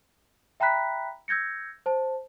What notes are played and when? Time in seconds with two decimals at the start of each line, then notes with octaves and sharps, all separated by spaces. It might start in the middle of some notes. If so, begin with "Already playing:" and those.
0.60 E5 G5 A#5 B5 F#6 B6
1.28 E6 G6 G#6 A#6 C#7
1.86 C5 A5